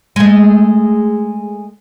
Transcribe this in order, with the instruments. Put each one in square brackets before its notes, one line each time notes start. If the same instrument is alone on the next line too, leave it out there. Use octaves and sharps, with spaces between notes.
[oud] G#3 A3